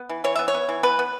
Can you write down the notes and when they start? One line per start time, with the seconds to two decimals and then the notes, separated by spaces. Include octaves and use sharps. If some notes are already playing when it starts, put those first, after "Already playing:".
Already playing: B3
0.09 E3
0.24 E3 C#5
0.35 B3 E5
0.48 C#5
0.54 B3
0.69 E3
0.83 B3 B4
0.99 B3